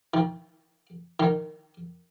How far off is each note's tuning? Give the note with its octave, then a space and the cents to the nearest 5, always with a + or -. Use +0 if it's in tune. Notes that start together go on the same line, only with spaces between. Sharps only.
D#3 +30
D#3 -10